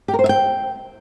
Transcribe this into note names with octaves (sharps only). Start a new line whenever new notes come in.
G4
A#4
C5
E5
G5